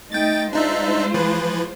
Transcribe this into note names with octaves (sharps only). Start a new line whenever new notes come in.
A3 D#4 D#5 G5 A6
G#3 D4 D#4 F4 C5 E5
E3 F3 B4